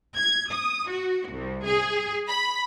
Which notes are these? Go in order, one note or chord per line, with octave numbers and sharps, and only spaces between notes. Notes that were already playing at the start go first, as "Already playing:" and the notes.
G#6
D#6
F#4
C2
G#4
B5